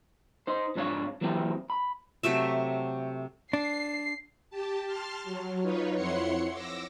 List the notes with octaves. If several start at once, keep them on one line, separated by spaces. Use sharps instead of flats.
D#4 C5
F2 G#2 D4 E4 C#5 F5
E3 F#3 A#3 C4 E4 G4
B5
C3 F#3 A3 E5
D4 C7
G4 A5
A5 C6 F6
F#3
D#4 F4 B4 C#5
F2 E4 C#5 F#5 C6 C#7
D6 E6 A#6